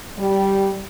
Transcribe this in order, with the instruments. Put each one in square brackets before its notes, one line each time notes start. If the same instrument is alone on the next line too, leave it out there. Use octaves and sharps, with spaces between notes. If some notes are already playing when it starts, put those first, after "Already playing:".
[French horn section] G3